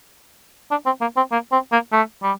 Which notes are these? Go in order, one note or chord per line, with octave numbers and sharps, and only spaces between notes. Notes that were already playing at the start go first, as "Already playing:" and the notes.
D4
C4
A#3
C4
A#3
C4
A#3
A3
G3